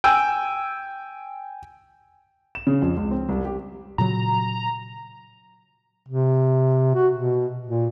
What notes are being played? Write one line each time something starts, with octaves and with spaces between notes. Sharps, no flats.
G5 G#5 E6
E7
C#3
F2
C#2
C4
C2
G4
A#2 C#3 F#3 A#5
C3
F#4
B2
A#2